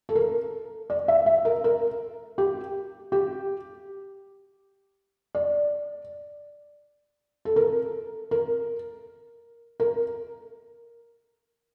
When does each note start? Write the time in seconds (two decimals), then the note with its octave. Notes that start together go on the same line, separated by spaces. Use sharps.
0.09 A4
0.15 A#4
0.90 D5
1.08 E5
1.26 E5
1.45 A#4
1.64 A#4
2.38 G4
3.12 G4
5.35 D5
7.45 A4
7.56 A#4
8.31 A#4
9.80 A#4